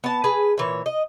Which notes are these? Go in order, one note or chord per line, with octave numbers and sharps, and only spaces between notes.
B3 A5
G#4 B4
A#2 E3 C#5
D#5